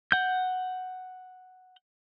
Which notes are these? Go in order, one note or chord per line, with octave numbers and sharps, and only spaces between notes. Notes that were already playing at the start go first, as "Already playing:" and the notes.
F#5 G6